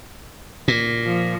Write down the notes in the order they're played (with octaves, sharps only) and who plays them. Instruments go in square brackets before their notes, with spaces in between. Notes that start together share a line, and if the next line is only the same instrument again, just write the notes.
[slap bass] A#2
[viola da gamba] F3